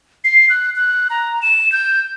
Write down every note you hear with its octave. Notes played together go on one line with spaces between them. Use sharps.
C7
F#6
F#6
A#5
E7
G6